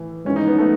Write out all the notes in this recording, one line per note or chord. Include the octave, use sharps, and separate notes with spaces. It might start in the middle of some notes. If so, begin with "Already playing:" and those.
Already playing: A2 E3
G#2 E3 C#4
D#4
B3
A3